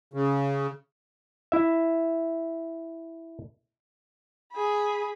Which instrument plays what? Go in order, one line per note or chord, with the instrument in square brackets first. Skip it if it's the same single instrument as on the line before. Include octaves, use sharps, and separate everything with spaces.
[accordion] C#3
[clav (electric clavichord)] E4 E5
[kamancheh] G#4 B5